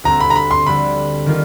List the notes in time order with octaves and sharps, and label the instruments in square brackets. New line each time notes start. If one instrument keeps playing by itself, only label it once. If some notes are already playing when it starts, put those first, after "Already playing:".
[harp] D2 D3 G3 C4 [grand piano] A#5
[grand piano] B5
A#5
B5
C6
[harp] D2 D3 G3 C4 [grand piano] B5
[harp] D#3 G3 F4